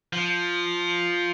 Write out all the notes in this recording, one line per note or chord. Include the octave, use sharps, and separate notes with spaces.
F3